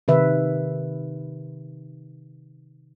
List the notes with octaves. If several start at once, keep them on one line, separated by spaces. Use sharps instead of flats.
C3 D#3 B4 E5